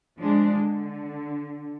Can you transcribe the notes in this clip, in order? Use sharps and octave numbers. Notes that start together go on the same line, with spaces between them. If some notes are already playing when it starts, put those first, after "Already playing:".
F3 G#3 D4
D3